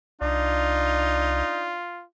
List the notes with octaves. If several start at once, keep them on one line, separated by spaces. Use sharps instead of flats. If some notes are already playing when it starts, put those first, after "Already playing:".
C2 D4 D#4 F4